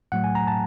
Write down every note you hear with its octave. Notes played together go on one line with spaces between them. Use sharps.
A2 F#3 A3 F#5
G#5
A#5
A5